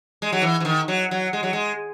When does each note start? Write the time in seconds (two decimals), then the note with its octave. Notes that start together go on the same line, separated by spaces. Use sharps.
0.22 G#3
0.32 F#3
0.42 E3
0.60 E3
0.65 D#3
0.88 F#3
1.11 F#3
1.33 G#3
1.43 F#3
1.53 G#3